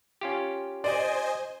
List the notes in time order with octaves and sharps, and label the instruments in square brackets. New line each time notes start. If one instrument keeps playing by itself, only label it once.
[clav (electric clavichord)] C#4 F4 G4
[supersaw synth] C5 D#5 G#5 [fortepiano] D5